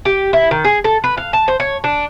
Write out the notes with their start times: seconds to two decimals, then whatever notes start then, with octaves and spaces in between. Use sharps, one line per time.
0.05 G4
0.33 E4
0.51 D#3
0.64 G#4
0.84 A4
1.04 B4
1.17 F5
1.33 A5
1.48 C5
1.60 C#5
1.84 D4